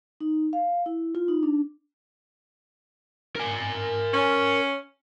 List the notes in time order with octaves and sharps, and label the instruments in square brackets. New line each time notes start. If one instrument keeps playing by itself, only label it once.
[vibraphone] D#4
F5
E4
F4
D#4
D4
[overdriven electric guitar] A#4 G#5
[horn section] C#4